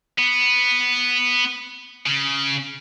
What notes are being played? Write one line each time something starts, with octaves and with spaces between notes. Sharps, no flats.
B3
C#3